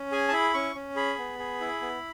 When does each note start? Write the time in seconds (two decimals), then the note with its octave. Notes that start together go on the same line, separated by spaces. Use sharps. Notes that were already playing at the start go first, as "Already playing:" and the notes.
Already playing: C#4
0.12 G#4 G#5
0.28 A5
0.32 E4 B5
0.54 C#4 C#6
0.75 C#4
0.96 G#4 B5
1.18 B3
1.39 G#4
1.60 E4
1.82 B3